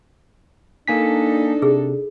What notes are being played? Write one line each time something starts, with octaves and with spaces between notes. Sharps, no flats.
A#3 D4 D#4 A4 G#5 B6
C3 G#4